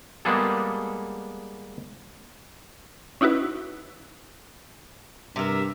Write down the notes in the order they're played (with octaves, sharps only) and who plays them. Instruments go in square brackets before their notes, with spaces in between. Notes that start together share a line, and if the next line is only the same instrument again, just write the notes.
[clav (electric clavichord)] G3 G#3 A#3 B3 G#4 A4
[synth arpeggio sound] C#4 D#4 E4 F#4 B4
[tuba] G2 [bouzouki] C3 A#4 [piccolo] E5